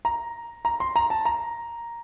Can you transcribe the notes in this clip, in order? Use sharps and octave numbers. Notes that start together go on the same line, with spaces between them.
A#5
A#5
C6
A#5
A5
A#5